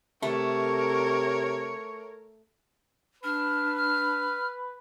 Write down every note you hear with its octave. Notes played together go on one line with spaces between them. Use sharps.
C3 A3 A#4 C#5 C#6
D4 B4 F6
F6